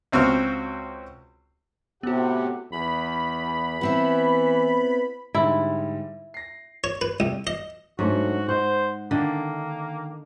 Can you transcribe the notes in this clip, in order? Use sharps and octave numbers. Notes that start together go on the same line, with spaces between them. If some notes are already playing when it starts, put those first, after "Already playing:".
C#2 C4 F#4 E6 F6
A2 C3 B3 F#4 G4 F#5
E2 B5
E3 B3 C4 E4
G#2 D3 G3 E4
A#6 C7
C#5
B4
C2
D#5
G#2 F#3 A3 D4 F#4
C5 D#5 F#5
D3 D#3 A#3